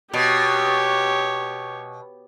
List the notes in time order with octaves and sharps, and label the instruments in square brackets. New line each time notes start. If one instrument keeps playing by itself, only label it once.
[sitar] B2 [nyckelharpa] G4 C#5